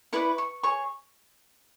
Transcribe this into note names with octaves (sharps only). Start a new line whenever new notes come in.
E4 B4 D5 C#6
C#6
G#4 C#5 C#6